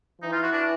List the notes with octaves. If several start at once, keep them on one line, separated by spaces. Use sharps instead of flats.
E3 D#4
F4
F#4
D4